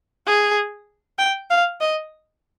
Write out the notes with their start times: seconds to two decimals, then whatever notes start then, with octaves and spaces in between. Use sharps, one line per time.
0.26 G#4
1.18 G5
1.50 F5
1.81 D#5